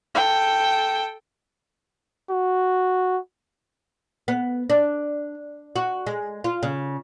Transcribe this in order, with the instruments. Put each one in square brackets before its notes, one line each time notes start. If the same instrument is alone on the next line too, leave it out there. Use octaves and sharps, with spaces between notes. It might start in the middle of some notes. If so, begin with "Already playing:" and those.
[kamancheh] A4 G5
[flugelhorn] F#4
[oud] B3
D4
F#4
G#3
F4
C#3